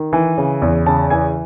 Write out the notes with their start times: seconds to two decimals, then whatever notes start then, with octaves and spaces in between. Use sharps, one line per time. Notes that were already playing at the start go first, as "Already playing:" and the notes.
Already playing: D#3
0.13 E3
0.38 C#3
0.62 E2
0.86 C#3 A5
1.10 E3 G#5